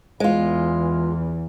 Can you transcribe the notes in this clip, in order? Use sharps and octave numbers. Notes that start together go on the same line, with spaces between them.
E2 G#3 F4